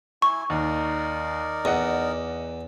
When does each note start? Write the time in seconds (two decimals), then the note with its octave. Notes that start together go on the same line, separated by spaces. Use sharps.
0.22 E4 G#5 C#6
0.50 D#2 D#4 A#4 D5
1.65 E2 D#5 F#5